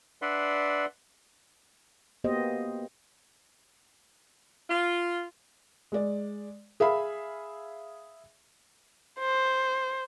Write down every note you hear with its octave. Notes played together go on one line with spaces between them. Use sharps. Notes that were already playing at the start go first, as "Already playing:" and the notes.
D4 B4 D5 E5 F#5 C6
A#3 B3 F#4 G4 C5 D#5
F4
G#3 D5
G#4 E5 F5 B5
C5